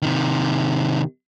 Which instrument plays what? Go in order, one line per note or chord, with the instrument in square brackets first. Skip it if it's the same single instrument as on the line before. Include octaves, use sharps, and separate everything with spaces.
[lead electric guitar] C3 D#3